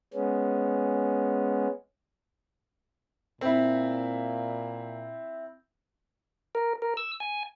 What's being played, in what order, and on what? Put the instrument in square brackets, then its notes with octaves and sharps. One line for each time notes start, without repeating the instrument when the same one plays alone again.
[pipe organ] G#3 B3 C#4
[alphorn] A#2 [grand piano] C4 E4
[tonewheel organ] A#4
A#4
E6
G#5